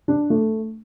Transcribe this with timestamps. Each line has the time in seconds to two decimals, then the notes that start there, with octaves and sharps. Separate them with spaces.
0.08 D4
0.30 A3